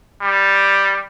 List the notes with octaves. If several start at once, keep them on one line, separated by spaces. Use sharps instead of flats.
G3